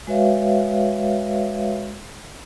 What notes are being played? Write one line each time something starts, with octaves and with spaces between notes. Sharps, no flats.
G#3 F#4 B4 C#5 E5 F5